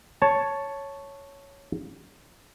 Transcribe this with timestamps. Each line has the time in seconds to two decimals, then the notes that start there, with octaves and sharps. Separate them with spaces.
0.22 C#5 A5